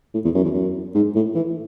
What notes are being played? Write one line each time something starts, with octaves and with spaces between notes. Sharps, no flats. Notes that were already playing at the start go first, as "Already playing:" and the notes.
A2
E2
F#2
E2
F#2
G#2
A2
E3